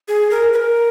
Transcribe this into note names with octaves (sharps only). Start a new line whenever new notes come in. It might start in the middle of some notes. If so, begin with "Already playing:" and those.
G#4
A#4
B4
A#4